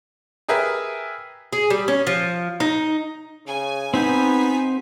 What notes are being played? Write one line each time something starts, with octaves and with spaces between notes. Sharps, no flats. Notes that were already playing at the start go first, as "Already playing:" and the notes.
G4 G#4 A#4 B4 E5 G#5
G#4
G3
C#4
F3
D#4
C#3 G#5
B3 C4 D#4 G4 G6 B6